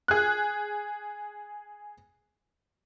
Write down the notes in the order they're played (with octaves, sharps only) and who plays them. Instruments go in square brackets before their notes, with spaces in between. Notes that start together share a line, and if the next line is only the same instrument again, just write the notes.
[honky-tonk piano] G#4 F#6